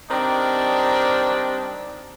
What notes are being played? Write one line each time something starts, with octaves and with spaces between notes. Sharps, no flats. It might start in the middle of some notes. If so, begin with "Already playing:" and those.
D#3 G3 C4 D4